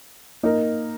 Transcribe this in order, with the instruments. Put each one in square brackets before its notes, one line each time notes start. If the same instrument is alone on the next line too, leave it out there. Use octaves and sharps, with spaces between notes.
[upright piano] A#3 D#4 A#4